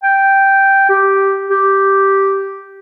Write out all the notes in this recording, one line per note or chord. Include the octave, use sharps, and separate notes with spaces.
G5
G4
G4